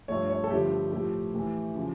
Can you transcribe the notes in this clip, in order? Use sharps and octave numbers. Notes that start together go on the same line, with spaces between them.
G2 F3 A3 C#5
C#5
A4
G2 D3 F3 A3 G4
A2 F3 A3 G4
A2 E3 A3
C#3 F3